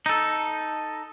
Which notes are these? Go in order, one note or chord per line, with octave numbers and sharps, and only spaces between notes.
D#4 A4